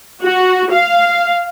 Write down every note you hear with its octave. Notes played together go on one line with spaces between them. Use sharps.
F#4
F5